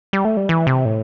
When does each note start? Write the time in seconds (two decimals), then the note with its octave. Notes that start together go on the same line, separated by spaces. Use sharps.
0.13 G3
0.25 A3
0.37 G3
0.49 E3
0.67 C3
0.85 A2